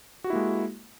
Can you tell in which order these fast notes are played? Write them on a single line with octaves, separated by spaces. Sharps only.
F#4 G4 E4 A#3 G#3